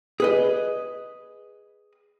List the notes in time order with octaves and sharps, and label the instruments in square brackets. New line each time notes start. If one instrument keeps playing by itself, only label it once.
[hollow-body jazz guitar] G#4 B4 D#5